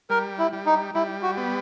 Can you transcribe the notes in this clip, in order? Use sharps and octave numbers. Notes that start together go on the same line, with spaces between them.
G3 A#4
E4
G3
D#4
G3 E4
F#4
B3